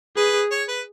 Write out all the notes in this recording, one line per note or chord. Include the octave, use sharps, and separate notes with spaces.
G#4 B4
C#5
B4